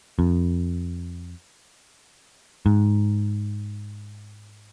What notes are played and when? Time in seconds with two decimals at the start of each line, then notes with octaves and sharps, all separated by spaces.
0.19 F2
2.66 G#2